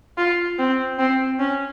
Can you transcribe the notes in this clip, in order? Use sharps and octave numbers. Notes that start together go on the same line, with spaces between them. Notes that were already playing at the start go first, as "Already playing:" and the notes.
F4
C4
C4
C#4